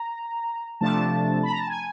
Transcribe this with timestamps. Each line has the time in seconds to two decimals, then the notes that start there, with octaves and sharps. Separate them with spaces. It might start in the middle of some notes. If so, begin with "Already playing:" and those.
Already playing: A#5
0.81 C3 F3 A3 D4 A5
1.43 B5
1.50 A#5
1.58 A5
1.67 G#5